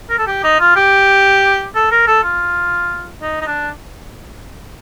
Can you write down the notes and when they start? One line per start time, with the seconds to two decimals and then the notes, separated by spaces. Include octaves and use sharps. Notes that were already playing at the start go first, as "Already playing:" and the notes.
0.10 A#4
0.18 A4
0.27 G4
0.44 D#4
0.60 F4
0.76 G4
1.75 A4
1.91 A#4
2.07 A4
2.23 F4
3.22 D#4
3.41 D#4
3.47 D4